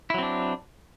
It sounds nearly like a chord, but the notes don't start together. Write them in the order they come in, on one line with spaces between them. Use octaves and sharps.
E4 F#3 C4 D4